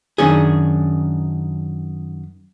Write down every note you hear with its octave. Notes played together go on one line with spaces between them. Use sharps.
F#2 D#3 C#4 D4 G#4